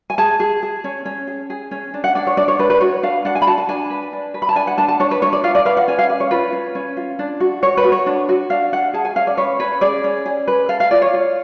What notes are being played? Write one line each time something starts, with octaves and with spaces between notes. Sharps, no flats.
G#5
G#4 A5
G#4
G#4
C#4
C#4
G#4
G#4
C#4
D4
F#5
D4 D5
C#5
D4 D5
C#5
D4 B4
B4
F#4 C#5
D4 F5
D4 F#5
G#5
B5
F#4 A5
A5
D4 G#5
B4
D4
B4
B5
A5
D4 G#5
F#5
D4 A5
A5
D4 C#5
B4
D4 C#5
D5
F4 F5
D5
B4 F5
F#5
C#4 G#5
F5
B4 D5
C#5
F4 B4
C#4
C#4
F4
D4
F#4
F#4 C#5
B4
F#4
C#5
D4
F#4
D4 F5
D4 F#5
G#4 A5
G#5
C#4 F5
D5
B4 C#5
C#4 B4
G#4 D5
C#4
G#4
B4
A4 F5
F5
F4 D5
C#5
F4